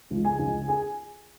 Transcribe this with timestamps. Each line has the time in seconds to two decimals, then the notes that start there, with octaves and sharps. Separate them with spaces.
0.10 C#2 C#3 F3 G#3
0.25 G#4 G#5
0.39 C#2 C#3 F3 G#3
0.68 G#4 G#5